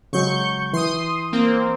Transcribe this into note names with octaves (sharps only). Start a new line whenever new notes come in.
C#3 F#3 G#3 C#6 G6
E3 C6 D#6
A#3 C4